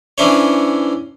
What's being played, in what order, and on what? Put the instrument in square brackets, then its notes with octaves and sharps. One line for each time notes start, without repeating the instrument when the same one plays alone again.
[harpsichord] E3 C#4 D4 E4 C5 C#5